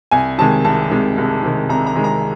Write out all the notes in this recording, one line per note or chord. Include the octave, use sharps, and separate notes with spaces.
C2 G#5
C3 D#3 G#3 A5
C2 A5
C3 D#3 G#3
C2
C3 D#3 G#3
C2 A#5
A#5
C3 D#3 G#3
A#5